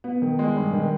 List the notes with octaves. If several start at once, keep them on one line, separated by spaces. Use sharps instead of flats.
B3
D#3
G#3
G2
D#3